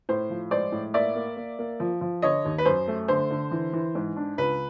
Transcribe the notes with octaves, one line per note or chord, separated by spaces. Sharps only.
A2 C5
F3
G#3 C5 D5
A2
A#3 D5 E5
A#3
A#3
A#3
F3
F3
D3 C#5 D#5
D#2
B4
F#2 C5
A3
D3 C5
D3
E3
E3
G#2
D4
C#2 B4